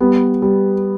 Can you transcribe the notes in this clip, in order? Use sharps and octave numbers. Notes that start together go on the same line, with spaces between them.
G3 B3
G3